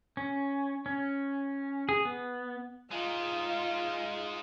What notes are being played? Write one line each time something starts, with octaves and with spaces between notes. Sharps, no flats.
C#4
C#4
G#4
B3
G#3 D#4 F4